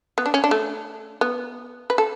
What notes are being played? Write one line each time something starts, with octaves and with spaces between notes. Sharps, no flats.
B3
D4
C#4
D4
A3
B3
B4
A4